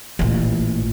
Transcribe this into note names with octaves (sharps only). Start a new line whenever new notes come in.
A1 A#2